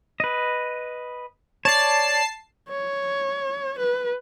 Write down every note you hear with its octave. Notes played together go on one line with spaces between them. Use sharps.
B4 D#5
C#5 D5 A5 C7
C#5
B4